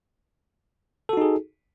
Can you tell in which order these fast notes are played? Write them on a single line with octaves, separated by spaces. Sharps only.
A4 F#4 D#4 G#4